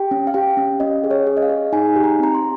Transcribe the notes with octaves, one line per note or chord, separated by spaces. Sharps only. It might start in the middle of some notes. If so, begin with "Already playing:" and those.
Already playing: G4 G5
C#4
F5
G4 G5
C#4
C#4 D#5
G#4
C#5
G#4
D#5
F5
G#4
D#4 G#5
G4
A#5
C4 A#5
C6